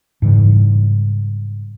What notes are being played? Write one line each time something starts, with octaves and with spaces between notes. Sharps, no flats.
G#2 C#3 E3 G3